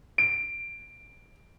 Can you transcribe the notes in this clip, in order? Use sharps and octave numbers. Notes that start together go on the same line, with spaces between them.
D7